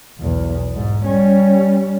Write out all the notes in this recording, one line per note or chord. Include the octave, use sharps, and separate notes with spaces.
B1 E2
G#2
G3 C#4